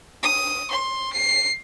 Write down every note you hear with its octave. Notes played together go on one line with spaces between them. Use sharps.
D#6
C6
C7